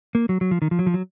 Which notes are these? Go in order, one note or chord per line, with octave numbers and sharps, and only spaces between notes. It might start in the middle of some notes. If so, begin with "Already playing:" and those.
A#3
F#3
F#3
F3
D#3
F3
F#3
F3
F#3